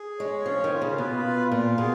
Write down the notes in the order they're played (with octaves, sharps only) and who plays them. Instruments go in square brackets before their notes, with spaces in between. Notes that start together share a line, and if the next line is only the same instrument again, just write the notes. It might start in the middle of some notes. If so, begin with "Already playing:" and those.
Already playing: [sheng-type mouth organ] G#4
[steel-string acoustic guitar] G#3 [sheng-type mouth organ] C#5
[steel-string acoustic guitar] F3 [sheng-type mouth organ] C#4
[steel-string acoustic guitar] D#3
[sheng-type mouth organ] F4
[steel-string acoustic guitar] C#3
[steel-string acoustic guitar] B2 [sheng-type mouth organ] B4
[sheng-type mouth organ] F4
[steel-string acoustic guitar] A#2 [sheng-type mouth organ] F4
[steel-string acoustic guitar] B2 [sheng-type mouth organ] G#4